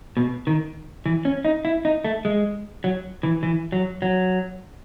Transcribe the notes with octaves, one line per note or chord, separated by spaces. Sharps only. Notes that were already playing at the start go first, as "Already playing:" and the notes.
B2
D#3
E3
C#4
D#4
E4
D#4
A3
G#3
F#3
E3
E3
F#3
F#3